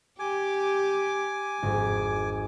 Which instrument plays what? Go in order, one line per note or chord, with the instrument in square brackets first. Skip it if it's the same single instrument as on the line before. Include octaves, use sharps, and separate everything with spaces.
[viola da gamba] G4 [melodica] G#5 D6
[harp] G#1 [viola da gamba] F2